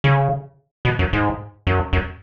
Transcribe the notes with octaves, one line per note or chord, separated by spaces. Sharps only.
C#3
B2
F#2
G#2
F#2
F#2